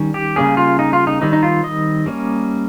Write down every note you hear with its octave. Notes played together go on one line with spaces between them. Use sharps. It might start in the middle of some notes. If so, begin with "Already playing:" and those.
Already playing: D#3 G3 C#4
G4
C#3 G3 A#3 C#4 G#4
F4
D#4
F4
D#4
D#3 G3 C4 D#4
D#4
F4
D#5
G3 A#3 C#4